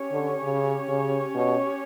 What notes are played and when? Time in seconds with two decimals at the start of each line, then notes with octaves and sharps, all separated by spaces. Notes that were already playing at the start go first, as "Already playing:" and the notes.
Already playing: C#4 G4 C#5
0.12 D3
0.42 C#3
0.88 C#3
1.34 B2